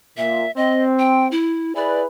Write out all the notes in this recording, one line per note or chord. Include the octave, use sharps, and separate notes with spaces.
A#2 E5
C4 D#5
G5
E4
E4 G#4 B4 D5